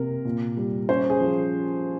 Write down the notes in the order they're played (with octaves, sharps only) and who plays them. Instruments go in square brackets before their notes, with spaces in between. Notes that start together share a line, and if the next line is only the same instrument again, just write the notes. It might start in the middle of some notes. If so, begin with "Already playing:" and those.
Already playing: [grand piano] C3 A#3 A#4
A#2
G3
C#4 C5
G#4
F3